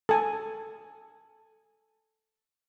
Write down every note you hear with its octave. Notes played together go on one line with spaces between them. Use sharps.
A4 G#5